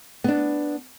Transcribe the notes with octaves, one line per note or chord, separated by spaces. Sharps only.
B3 D4